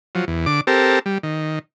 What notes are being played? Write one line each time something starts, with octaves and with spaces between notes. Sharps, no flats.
F3 F#3
E2
D3 D6
C4 G4 A4 A#4
G3
D#3